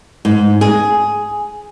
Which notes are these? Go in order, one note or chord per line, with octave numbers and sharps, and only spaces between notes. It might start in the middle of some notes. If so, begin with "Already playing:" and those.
G#2
G#4